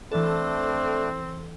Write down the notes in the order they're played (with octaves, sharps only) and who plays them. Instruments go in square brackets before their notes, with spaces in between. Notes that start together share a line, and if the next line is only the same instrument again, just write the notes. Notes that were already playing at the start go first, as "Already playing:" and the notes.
[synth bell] E3 A4 [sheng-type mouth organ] A3 D4 [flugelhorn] C4